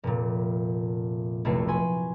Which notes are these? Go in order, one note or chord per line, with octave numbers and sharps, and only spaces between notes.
F1 A#2
F1 B1 A3 E4 F#4 C7
F#4 G#5 B5 C6